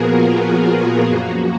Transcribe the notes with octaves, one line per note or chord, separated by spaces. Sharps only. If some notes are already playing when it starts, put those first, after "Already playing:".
Already playing: A#2 F3 B3 F#4 G#4 A#4
F4
F4
F#2 F3 A#3 F#4